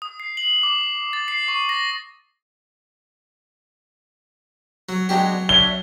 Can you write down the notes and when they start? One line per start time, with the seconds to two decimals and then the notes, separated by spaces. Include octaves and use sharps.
0.02 D#6
0.20 C7
0.37 F#7
0.63 D6
1.13 A6
1.28 C7
1.48 C#6
1.69 A#6
4.89 F#3
5.09 F#3 G#3 B3 D4 G4 G5 G#5 A#5
5.49 D4 C#5 E5 G7